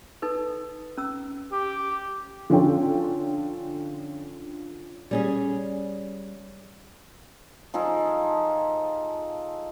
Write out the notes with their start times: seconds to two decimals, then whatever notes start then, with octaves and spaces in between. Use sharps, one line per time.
0.22 D#4 A4 B4
0.97 C#4 A#5 E6
1.52 G4
2.50 D3 F3 C#4 F4 A4 G5
5.11 G3 C#4 G#4
7.74 F3 D#4 G#4 A4